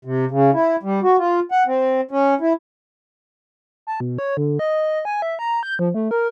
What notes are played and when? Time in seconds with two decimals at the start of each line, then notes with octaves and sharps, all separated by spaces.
0.05 C3
0.31 C#3
0.54 E4
0.83 G3
1.03 F#4
1.18 F4
1.52 F#5
1.67 C4
2.11 C#4
2.41 E4
3.87 A5
4.00 B2
4.18 C#5
4.37 D3
4.59 D#5
5.05 G#5
5.22 E5
5.39 A#5
5.63 G6
5.79 F3
5.94 A3
6.11 A#4